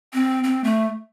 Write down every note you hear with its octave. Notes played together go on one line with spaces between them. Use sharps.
C4
C4
A3